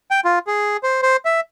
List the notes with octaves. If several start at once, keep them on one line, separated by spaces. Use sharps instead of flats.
G5
F4
G#4
C5
C5
E5